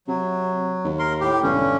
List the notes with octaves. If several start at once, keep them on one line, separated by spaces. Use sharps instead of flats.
C3 F#3
D#2
A#4 C6
A2 G4
E1 G2 D3 C#4